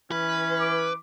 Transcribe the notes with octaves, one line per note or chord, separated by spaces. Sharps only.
E3 C#4 B4
D6